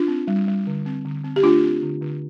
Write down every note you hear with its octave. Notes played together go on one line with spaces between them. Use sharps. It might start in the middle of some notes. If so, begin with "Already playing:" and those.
Already playing: D4 F4
C4
G3
G3
D3
C4
D3
C4
G4
A3 D4 F4
C4
D3
D3